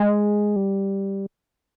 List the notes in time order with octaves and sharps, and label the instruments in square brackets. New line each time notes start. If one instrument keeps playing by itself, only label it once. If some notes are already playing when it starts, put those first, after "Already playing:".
Already playing: [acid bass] G#3
G3